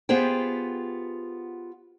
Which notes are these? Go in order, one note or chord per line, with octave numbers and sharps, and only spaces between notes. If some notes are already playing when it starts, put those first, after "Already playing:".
B3 F4 G4 G#4 C5 G5